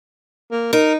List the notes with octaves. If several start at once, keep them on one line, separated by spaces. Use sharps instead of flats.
A#3
D#4 A#4